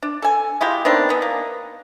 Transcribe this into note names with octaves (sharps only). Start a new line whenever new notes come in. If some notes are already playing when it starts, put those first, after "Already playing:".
D4
A4 G#5
G#3 E4 F4 G4
D#3 B3 C4 D4
E3 B3
A#3